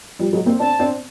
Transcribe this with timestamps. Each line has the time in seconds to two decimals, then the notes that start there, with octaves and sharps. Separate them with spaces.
0.19 F3 G3
0.33 F#3 G#3
0.46 A#3 C4
0.60 C4 D4 A5
0.79 C4 D4